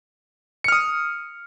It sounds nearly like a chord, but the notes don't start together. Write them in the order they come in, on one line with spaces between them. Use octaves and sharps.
C#7 F6 D#6